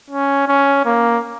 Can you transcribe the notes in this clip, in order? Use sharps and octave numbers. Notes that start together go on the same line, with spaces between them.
C#4
C#4
A#3